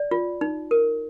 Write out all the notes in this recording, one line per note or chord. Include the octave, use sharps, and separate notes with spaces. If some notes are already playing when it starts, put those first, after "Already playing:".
Already playing: D5
F4
D#4
A#4